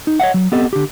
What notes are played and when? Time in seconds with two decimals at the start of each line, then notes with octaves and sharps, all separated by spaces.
0.07 D#4
0.20 C#5 D#5 E5 F#5
0.34 F#3
0.52 B3 C4 G4 A4 D#5
0.73 D3 G4